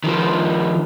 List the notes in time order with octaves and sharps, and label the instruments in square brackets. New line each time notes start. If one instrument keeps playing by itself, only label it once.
[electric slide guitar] D#3 F3